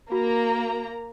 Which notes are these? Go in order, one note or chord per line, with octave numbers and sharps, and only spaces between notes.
A#3 F#4 A#5